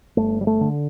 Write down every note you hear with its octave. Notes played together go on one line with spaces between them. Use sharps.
G1 A3
G3
A3
D3